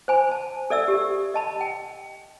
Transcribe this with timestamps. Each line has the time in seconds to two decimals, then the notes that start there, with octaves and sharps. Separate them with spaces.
0.08 C5 G#5 B5
0.31 A5
0.70 A4 D5 E5 E6
0.88 G4
1.34 D#5 A5 B5
1.61 G5